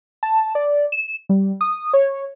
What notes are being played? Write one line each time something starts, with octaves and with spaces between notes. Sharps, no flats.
A5
D5
E7
G3
D#6
C#5